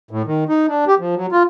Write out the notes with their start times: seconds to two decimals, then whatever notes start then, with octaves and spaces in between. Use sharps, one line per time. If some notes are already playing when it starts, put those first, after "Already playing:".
0.11 A2
0.27 D#3
0.49 D#4
0.68 D4
0.88 G4
1.00 F3
1.16 F#3
1.32 F4